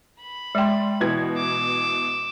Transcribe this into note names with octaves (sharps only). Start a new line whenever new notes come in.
B5
G#3 D5 G5 C6
B2 E3 G#6
D6 E6